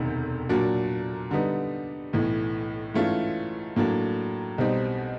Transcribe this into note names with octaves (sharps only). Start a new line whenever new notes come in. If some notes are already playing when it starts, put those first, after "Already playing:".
Already playing: E1 D2 C3 D#3
A#2 F#3 A#3 D4 F#4
D3 G3 B3 D#4
B1 A2 E3
G#2 E3 A3 C#4 F4
A2 F#3 A#3 D4
B1 B2 G3 C4 D#4